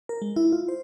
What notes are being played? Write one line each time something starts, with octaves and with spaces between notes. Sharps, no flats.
A#4
G#3
E4
F4
C5